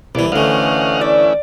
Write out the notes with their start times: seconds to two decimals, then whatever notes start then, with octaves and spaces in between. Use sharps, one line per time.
0.15 C2 B2 E3 D5
0.32 D2 D3 E3 A3 C#4 D#5 F5 F#5
1.01 E4 D5